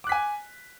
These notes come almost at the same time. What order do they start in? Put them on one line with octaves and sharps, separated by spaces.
D6 F#6 B6 G#5